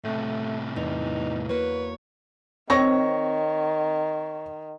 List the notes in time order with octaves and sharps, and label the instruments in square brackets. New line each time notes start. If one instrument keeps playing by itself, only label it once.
[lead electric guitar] A2 C3 [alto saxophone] A3
[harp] E2 [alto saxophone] D#4
[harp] A#3 F#4 [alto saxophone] B4 [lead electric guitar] C#5
[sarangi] D#3 [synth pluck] C4 [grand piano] C#5 C#6 A#6